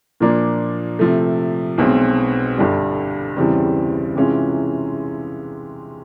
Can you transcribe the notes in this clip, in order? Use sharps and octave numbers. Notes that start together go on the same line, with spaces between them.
A#2 F3 A#3 D4
C3 F3 A3
B1 B2 G#3 C4
G1 G2 D3 G3
E2 C#3 E3 G3 C4
C3 E3 G#3 C#4 F4